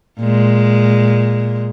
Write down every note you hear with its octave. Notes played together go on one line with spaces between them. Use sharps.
A#2 G#3